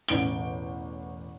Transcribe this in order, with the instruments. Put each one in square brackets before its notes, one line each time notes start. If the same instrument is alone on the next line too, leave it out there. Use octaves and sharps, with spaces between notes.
[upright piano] E1 A1 D7 G7